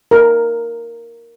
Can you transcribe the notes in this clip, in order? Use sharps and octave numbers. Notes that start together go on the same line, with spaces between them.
A#4